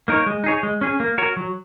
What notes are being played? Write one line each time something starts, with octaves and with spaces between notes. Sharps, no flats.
A#3 D#4 A#4 C#5
G#3
D#4 G#4 C#5
G#3
C#4 G#4
A#3
F#4 A#4 C#5
F#3